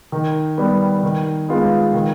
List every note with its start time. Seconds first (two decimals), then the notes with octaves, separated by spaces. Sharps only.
0.12 D#3
0.58 G3 B3
1.03 D#3
1.48 G#3 B3 F4
1.94 D#3